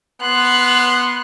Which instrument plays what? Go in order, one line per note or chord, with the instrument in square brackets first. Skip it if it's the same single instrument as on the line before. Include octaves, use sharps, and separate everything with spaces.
[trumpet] B3 [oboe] C6 [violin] F#6